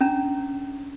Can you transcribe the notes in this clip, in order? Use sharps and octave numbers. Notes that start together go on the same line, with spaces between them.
C#4 D4 A#5